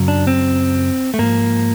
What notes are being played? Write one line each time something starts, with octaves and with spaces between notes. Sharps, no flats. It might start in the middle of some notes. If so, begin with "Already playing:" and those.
Already playing: F#2 C#3 F#3
D4
C4
A3
G#2 F3 A#3